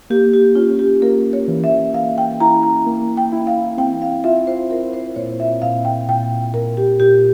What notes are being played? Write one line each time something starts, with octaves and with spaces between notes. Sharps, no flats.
A#3 G4
G4
C#4 F4
G4
A#3 A#4
C#5
E3
E5
E3 F5
G5
E4 A#5
A#5
A#3
G5
E4
F5
C4 G5
F5
F4 E5
C5
F4 A#4
C5
A#2 C#5
E5
A#2 F5
G5
A#2 G5
A#2 A#4
G4
A#2 G4